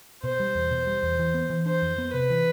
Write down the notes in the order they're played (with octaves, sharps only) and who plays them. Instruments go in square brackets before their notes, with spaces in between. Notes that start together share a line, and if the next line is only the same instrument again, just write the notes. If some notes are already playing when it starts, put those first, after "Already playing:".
[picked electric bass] B2 [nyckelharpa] C5
[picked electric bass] G3
E2
B2
G3
E2
E3
B3
E3
[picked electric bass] D4 [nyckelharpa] C5
[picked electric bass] F2
B3
[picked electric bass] C3 [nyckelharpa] B4
[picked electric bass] E3